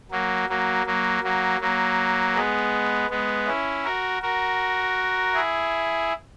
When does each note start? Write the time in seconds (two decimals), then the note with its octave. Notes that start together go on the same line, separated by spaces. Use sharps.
0.11 F#3 A#3
0.49 F#3 A#3
0.86 F#3 A#3
1.23 F#3 A#3
1.60 F#3 A#3
2.35 G#3 B3
3.10 G#3 B3
3.47 C#4 E4
3.85 F#4 A#4
4.22 F#4 A#4
5.34 E4 G#4